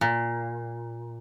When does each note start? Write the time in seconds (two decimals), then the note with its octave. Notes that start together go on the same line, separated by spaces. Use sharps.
0.01 A#2